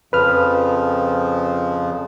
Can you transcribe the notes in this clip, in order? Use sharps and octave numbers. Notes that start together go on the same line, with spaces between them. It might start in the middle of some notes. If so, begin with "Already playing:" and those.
F2 C#3 F3 B4 F6